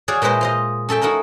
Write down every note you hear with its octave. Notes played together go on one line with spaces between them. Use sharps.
F#4 G#4 C#5 D5 F5 F#5
A#2 G#3 E4 B4 C5 D#5
F4 C5 D#5
C#4 A4 E5 G5
D#4 E4 F#4 A4 A#4